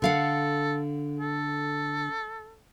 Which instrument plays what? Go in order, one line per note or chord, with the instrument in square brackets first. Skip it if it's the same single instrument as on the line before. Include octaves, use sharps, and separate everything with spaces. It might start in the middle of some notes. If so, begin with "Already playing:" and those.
[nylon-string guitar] D3 F5 F#5 [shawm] A4
[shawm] A4